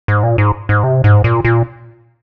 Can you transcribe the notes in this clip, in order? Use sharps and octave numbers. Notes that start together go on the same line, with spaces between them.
G#2
A#2
G#2
G#2
C3
G#2
A#2
A#2